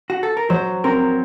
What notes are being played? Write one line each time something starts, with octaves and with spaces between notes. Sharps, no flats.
F#4
A4
A#4
F#3 C5
C4 A#4